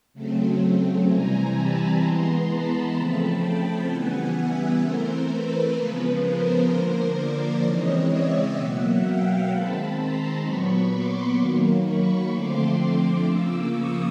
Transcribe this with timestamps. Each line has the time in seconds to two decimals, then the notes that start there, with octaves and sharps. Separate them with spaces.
0.14 C#3 F#3 A3 C4
1.07 C3 E3 G3 C4 G#5 A#5
1.54 A5 B5
2.00 E3 G#3 B3 A#5 C6
2.47 A5 B5
2.94 C#3 F3 A3 C4
3.41 G5 A5
3.88 C#3 E3 G3 B3 F#5 G#5
4.35 E5 F#5
4.82 E3 A3 C4 A#4 C5
5.29 B4
5.75 C#3 F3 G#3 B3 B4
6.22 A#4 C5
6.69 D3 F3 A#3
7.16 C5 D5
7.63 C#3 E3 G#3 C4 C#5 D#5
8.10 D5 E5
8.57 B2 F#3 A#3 E5 F#5
9.03 F5 G5
9.50 D#3 G#3 C4 A5 B5
9.97 A#5 C6
10.44 A#2 F#3 B3 B5 C#6
10.91 C6 D6
11.38 D#3 F#3 A#3
11.85 B5 C#6
12.31 D3 F3 A3 C4 C6 D6
13.25 C#3 F3 A#3 D6 E6
13.72 C#6 D#6